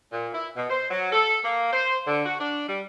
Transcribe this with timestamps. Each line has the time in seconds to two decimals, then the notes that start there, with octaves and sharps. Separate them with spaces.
0.12 A#2
0.34 E4
0.56 B2
0.70 C5
0.91 F#3
1.13 A4
1.45 A#3
1.73 C5
2.07 D3
2.26 F#4
2.40 D4
2.69 G3